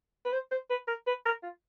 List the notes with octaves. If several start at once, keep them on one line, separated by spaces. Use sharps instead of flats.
B4
C5
C5
B4
A#4
B4
A#4
F4